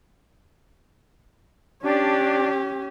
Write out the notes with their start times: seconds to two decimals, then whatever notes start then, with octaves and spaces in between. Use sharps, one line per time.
1.83 C#4 D4 G4